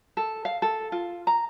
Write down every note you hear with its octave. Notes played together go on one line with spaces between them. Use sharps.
A4
F5
A4
F4
A#5